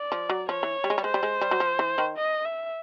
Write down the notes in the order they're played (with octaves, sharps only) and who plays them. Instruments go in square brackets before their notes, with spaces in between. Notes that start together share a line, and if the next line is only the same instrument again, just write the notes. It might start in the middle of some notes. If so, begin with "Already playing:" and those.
Already playing: [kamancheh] D5
[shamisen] F3
F#3
[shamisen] F3 [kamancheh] C#5
[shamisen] E3
G3
G#3
G3
[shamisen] G#3 [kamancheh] C5
[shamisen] G3
G#3
G3
F#3
F3
E3
D#3
[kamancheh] D#5
E5